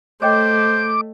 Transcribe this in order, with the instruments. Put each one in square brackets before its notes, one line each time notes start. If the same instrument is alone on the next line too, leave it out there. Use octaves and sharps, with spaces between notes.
[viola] A3 [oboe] C5 [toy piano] C#5 D#5 G5 [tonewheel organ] D6